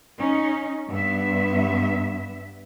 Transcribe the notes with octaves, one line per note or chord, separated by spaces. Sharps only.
C#4 D#4
G2 B3 E5